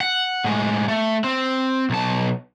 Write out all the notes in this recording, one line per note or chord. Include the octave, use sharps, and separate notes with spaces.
F#5
A2 G#3
A3
C4
B1 A5